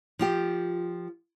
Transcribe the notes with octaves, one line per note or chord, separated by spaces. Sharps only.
F3 F4 G4